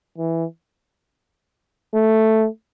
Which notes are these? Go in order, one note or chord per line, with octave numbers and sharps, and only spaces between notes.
E3
A3